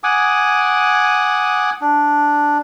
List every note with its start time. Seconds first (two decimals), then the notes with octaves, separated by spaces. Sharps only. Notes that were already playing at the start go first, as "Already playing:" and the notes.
0.04 F#5 G#5 D6 D#6
1.81 D4